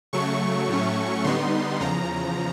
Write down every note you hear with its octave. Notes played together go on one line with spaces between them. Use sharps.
C#3 F#3 A3 C#6
A2 F#3 A3 C#4
D3 G3 B3 D#4 C6
E2 C#3 F3 A#5